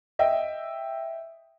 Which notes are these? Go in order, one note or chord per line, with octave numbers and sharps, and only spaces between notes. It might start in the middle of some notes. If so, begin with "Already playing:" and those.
D#5 E5 G5